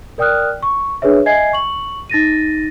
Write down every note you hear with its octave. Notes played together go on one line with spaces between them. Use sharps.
A#4 D5 G5 D#6 F6 F#6
C#6
D4 G#4 B4 C#5 E5
D#5 E5 G#5 G#6 C7
C#6 F#7
D#4 A6 A#6 D#7